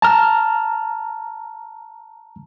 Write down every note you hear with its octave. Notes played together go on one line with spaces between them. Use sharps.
A5 A#5 F6